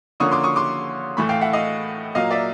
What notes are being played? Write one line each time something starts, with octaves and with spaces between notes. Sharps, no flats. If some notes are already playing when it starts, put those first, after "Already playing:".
D3 F3 A#3 C#4 C#6 D#6
C6 D6
C#6 D#6
C6 D6
A2 E3 A3 B5 C#6
F5 G5
E5 F#5
D#5 F5
A#2 F#3 A#3 D#5 F5
D5 E5